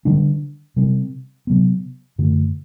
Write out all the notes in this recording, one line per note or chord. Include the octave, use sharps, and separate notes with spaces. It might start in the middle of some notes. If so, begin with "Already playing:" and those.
D3 G3 D4
C3 G3 C4
C3 F#3 B3
F#2 D3 A3